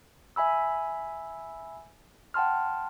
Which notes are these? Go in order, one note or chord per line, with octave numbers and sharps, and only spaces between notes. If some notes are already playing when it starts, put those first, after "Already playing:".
E5 G#5 B5 E6
F#5 G5 A5 C6 F6